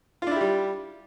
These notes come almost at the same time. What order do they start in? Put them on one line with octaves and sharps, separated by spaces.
F4 D4 E4 G4 G3